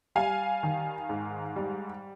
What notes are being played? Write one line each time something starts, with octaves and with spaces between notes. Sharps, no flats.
G3 F5 G#5
D#3
G#2
G3